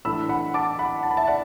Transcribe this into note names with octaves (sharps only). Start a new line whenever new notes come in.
A2 E3 A3 D4 B5 E6
F#5 B5
A5 D6
F#5 B5
A5
B5
E5 A5
D5 F#5